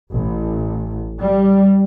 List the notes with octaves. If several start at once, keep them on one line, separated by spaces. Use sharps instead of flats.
A1
G3